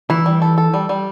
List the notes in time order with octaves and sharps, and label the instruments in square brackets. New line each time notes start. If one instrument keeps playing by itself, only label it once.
[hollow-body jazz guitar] E3 [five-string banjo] E4
[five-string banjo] G3
A4
A4
G3
G3